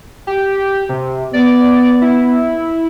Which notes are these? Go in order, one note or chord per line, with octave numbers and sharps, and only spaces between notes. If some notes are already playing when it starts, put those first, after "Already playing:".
G4
C3
B3 D5
E4